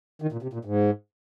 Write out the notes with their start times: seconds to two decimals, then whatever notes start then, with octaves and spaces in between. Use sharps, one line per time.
0.22 D#3
0.32 A#2
0.42 C3
0.53 A#2
0.65 G#2